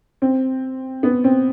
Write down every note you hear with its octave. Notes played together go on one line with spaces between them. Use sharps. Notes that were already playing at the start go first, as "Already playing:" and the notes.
C4
B3
C4